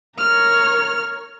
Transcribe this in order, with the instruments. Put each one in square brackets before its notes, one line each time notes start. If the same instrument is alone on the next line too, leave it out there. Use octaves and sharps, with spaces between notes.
[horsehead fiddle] A#4 C#5 [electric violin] F6